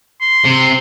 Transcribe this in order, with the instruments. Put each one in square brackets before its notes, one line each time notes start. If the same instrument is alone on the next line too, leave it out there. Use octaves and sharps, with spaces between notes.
[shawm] C6
[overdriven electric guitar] C3